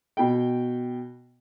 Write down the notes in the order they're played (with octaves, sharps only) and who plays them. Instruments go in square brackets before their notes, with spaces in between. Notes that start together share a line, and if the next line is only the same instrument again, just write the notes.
[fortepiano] B2 G5